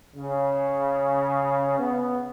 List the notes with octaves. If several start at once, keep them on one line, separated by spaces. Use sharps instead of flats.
C#3
B3